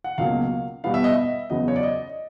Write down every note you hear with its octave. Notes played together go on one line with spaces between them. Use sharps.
F#5
C#2 B2 F#3 A#3 C#4 F5
E2 B2 G3 B3 F5
E5
D#5
E5
E2 C#3 F#3 B3 D#5
C#5
D5
D#5